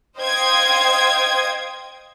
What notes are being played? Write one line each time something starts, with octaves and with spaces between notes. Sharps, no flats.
C5 D#5 F5 G5 D#6 G#6